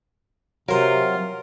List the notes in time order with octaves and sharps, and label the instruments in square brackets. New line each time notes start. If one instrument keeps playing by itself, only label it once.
[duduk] C3 [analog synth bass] F#3 [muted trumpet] F4 [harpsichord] A#4 C5